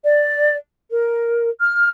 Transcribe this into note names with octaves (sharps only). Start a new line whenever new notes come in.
D5
A#4
F6